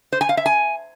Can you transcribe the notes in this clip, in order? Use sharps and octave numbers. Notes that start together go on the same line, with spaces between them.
C5
G#5
F5
E5
G#5